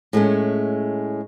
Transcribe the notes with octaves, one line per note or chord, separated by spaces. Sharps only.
A2 G#3 A3 C#4